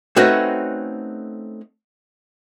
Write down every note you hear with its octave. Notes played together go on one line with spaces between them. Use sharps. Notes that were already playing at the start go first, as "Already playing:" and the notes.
A3 C4 C#4 D#4 F#4 B4